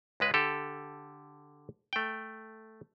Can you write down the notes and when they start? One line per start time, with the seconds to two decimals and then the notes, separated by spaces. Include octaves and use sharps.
0.20 C#2 G#3 B4
0.34 D3 G4 A4
1.93 A3 G5